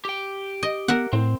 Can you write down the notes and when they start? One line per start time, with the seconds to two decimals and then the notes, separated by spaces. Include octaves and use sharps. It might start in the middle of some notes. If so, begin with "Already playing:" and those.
0.05 G4 G5
0.63 D#5
0.88 B3 A#4 E5 F#5
1.13 A2 C4